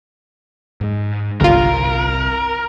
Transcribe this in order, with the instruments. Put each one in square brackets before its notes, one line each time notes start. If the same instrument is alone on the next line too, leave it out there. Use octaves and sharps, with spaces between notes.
[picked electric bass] G#2 G#3
[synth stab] G1 F4 [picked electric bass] C2 [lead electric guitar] A#4